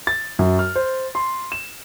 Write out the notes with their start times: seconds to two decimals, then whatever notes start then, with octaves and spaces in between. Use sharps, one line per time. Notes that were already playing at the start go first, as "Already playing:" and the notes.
0.07 A6
0.39 F#2
0.59 F6
0.76 C5
1.15 C6
1.52 E7